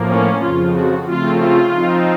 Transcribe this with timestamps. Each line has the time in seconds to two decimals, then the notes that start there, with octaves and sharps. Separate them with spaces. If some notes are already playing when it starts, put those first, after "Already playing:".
Already playing: A2 F3 A#3
0.09 C#4
0.42 F2 C#3 F3 F4
0.75 F#4
1.07 C#3 F3 A3 C4 F4
1.41 F4
1.73 F3 C4 D#4